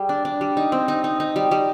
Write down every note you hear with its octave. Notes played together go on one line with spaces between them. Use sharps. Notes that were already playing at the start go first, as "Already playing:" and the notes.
Already playing: G3 G#4
D4
D4
G3
D#4
C4
D#4
D#4
D#4
G3
G3